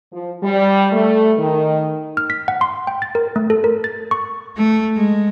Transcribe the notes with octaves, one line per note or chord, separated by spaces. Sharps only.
F3
G3
A3
D#3
F6
B6
F#5
C6
G5
A6
A#4
A3
A4
A#4
A6
C#6
A3
G#3